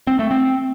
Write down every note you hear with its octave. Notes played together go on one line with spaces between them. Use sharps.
C4
A3
C4